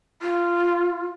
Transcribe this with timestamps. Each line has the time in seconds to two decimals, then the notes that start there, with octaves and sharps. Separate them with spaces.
0.22 F4